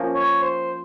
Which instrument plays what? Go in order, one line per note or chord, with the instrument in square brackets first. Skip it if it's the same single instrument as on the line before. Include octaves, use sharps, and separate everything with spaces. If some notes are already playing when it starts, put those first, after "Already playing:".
Already playing: [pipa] F3 A#3 C#4
[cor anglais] C#5
C5